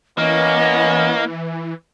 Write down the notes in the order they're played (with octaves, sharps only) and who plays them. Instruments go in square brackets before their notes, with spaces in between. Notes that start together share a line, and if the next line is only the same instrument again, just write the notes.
[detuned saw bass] E3 [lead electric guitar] A#3 [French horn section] B3 C#4 [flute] D#5